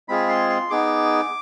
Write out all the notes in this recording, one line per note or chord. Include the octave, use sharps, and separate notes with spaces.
G#3 C4 F4 G#4 B5
C6
C6
B3 D#4 G#4 D6